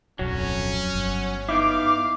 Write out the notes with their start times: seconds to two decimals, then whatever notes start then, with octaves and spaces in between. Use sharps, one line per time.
0.19 D1 B1 F2 F#3 C#4
0.94 G1
1.49 B3 D#4 E4 F5 D6